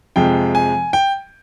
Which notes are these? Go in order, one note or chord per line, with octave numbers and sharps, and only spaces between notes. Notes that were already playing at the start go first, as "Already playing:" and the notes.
F2 C3 F3 G#3 G5
G#5
G5